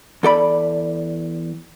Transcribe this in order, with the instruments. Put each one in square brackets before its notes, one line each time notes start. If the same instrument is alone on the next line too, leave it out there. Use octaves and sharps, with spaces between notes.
[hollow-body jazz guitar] E2 A4 D5 B5